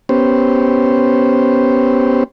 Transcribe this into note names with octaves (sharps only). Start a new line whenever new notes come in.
B3 C#4 G4 C5